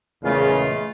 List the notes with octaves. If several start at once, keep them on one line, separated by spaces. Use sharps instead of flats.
E2 A#2 C#3 G#3 A3 F4